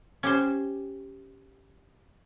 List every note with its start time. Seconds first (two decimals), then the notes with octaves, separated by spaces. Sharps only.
0.23 C#4 G4 C5